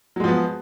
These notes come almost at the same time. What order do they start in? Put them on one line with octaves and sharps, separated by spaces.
F#3 G#3 F3 B3